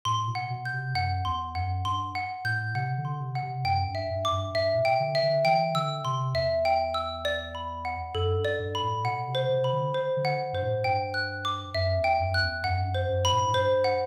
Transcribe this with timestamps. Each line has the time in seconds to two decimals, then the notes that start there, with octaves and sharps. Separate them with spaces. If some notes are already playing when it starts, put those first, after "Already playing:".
0.05 A2 C6
0.28 B2
0.35 F#5
0.50 B2
0.65 G6
0.73 C3
0.95 F#2 F#5
1.25 E2 C6
1.55 F#2 F#5
1.85 G2 C6
2.15 F#5
2.44 A2 G6
2.75 C3 F#5
2.98 D3
3.05 C6
3.20 C3
3.35 F#5
3.42 C3
3.65 F#2 G5
3.88 G2
3.95 E5
4.10 G2
4.25 D6
4.32 G2
4.54 G2 E5
4.74 A2
4.78 B2
4.85 G5
5.00 D3
5.15 E5
5.22 D3
5.45 E3 G5
5.74 D3 E6
6.05 C3 C6
6.34 E2 E5
6.65 G5
6.94 E6
7.25 D5
7.55 B5
7.85 F#5
8.14 F#2 A4
8.37 G2
8.45 D5
8.59 G2
8.75 B5
8.82 A2
9.04 B2 F#5
9.28 C3
9.35 C5
9.49 C3
9.64 B5
9.73 D3
9.94 C5
10.17 D3
10.25 F#5
10.53 G2 C5
10.62 A2
10.84 G2 G5
11.14 F#6
11.45 D6
11.74 F#2 E5
11.97 E2
12.04 G5
12.19 F#2
12.34 F#6
12.42 E2
12.64 F#2 F#5
12.82 G2
12.87 F#2
12.95 C5
13.09 F#2
13.25 B5
13.32 A2
13.39 G2
13.46 A2
13.54 G2 C5
13.84 F#5